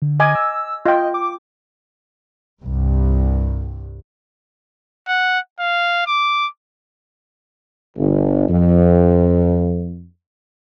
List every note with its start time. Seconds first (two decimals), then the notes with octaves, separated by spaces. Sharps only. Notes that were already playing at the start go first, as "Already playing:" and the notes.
0.02 D3
0.20 D#5 G#5 D6
0.35 E6
0.86 F4 D#5 G5
1.14 D6
2.61 C2 G2
5.08 F#5
5.60 F5
6.07 D6
7.97 G1
8.48 F2